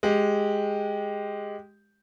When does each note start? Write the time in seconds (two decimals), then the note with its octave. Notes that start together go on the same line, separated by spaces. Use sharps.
0.03 G#3 G4